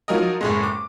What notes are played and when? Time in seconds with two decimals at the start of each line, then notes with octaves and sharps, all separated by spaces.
0.08 F3 F#3 D#4 A#4 D#5
0.41 F#1 A2 G#3
0.63 D6